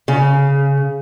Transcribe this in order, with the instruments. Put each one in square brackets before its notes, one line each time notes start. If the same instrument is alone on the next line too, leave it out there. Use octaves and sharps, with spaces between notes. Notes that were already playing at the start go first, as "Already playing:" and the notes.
[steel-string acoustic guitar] C#3